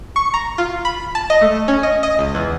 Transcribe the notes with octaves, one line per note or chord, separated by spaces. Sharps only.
C#6
A#5
F4
B5
A5
D#5
A3
C#4
D#5
D#5
C#2
E2